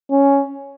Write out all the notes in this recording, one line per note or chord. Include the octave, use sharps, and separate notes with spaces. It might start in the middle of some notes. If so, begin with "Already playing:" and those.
C#4